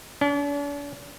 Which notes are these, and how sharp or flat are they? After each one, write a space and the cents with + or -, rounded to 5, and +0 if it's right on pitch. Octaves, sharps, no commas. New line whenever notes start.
D4 -45